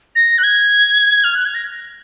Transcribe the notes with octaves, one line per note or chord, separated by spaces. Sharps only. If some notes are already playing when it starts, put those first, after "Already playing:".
A#6
F#6
G#6
F6
F#6
G#6
A#6